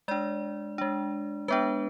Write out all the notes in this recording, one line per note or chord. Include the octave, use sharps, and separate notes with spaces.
G#3 D4 D5
G#3 D4
G#3 B3 D4 B4